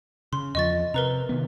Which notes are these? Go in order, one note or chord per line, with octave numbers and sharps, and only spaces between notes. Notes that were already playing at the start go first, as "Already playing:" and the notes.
C#3 C6
E2 F3 D#5 C#6 A6
C3 A#4 B4 A#5
C3 D#3 B3